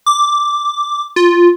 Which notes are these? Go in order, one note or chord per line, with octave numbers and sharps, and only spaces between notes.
D6
F4